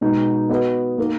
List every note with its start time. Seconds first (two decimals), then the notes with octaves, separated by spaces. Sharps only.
0.01 B2 G#3 D#4 G#4
0.49 B3 F#4 B4 D#5
0.98 A#3 D#4 A#4